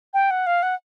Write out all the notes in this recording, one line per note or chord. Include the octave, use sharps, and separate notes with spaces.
G5
F#5
F5
F#5